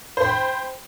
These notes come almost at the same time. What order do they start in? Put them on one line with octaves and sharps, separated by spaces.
C5 B5 G5